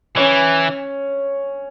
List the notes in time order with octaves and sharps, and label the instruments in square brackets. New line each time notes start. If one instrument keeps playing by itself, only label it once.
[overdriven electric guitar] E3 [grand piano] C#4 C#5